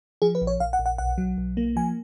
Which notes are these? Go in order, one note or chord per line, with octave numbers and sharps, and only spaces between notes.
F3 G#4
B4
A#1
C#5
A#1 F5
F#5
A#1
F#5
B1 F#5
F#3
B1
A#3
F3 G#5